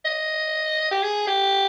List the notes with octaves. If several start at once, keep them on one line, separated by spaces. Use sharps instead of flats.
D#5
G4
G#4
G4